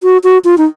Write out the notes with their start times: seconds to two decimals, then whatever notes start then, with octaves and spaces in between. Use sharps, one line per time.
0.03 F#4
0.24 F#4
0.45 F4
0.58 D#4